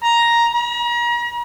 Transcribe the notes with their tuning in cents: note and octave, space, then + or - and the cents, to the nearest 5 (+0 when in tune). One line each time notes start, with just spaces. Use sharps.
A#5 +5
A#5 +40